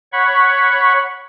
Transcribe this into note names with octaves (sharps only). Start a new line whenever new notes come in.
C#5 F#5 B5 C#6